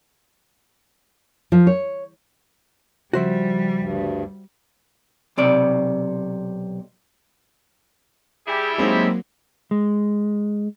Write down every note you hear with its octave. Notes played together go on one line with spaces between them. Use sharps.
F3
C#5
C#3 F3 G3 F#4 C5 E5
D2 G2
B1 C3 D5
G3 E4 G4 G#4
F#3 G#3 A#3 C4 D#4
G#3